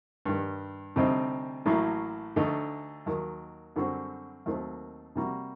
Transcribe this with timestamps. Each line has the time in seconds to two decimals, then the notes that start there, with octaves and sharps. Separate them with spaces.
0.26 G2 D#3 G3
0.96 D2 C3 G3 C4 D#4
1.66 A1 A2 F#3 A#3
2.36 D2 D3 A3 D#4
3.06 D#2 D#3 F#3
3.76 F#2 D3 G3 C4 F#4
4.46 D#2 D#3 F#3 A3 C4
5.16 C3 G3 A#3 F#4 A#4